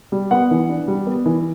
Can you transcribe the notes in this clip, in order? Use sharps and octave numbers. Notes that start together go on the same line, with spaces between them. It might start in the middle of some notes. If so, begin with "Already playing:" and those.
G3
B3 F#5
E3
D4
G3
B3
E3